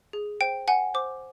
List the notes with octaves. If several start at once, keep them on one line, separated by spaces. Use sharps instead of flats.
G#4
C5 G5
F#5 G#5
C5 D6